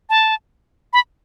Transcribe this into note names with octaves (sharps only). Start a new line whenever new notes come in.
A5
B5